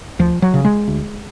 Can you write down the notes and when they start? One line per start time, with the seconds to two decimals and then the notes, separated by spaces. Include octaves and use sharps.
0.19 D2 F3
0.42 F#3
0.54 C#3
0.64 G#3
0.88 D2